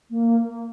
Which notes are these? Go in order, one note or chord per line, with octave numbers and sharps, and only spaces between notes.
A#3